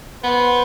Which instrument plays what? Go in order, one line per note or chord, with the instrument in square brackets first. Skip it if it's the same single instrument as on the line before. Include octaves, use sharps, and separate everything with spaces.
[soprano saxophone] B3 [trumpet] C5